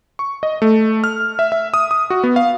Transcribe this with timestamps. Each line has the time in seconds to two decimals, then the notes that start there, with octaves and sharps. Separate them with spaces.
0.19 C#6
0.43 D#5
0.62 A3
1.04 F6
1.39 E5
1.52 E5
1.74 D#6
1.91 D#6
2.10 F#4
2.24 B3
2.36 F5